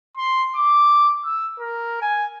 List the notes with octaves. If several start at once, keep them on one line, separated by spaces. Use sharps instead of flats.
C6
D6
E6
A#4
G#5